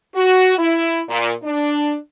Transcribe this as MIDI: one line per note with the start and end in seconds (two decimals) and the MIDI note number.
0.15 0.54 66
0.58 1.01 64
1.09 1.32 46
1.44 1.96 62